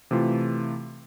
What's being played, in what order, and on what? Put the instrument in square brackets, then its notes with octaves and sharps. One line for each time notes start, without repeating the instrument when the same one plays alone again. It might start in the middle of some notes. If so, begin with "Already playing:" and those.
[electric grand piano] C3 E3 A3 F4